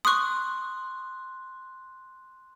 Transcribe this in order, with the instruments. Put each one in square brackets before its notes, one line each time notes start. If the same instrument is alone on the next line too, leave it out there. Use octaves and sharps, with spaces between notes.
[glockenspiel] C6 F#6 [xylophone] C#6 D#6